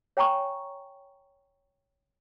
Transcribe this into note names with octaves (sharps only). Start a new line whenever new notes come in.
C#5 G5 G#5 A#5 C#6